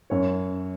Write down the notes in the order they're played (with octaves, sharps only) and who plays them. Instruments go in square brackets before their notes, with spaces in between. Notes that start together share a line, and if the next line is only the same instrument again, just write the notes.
[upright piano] F#2 C#5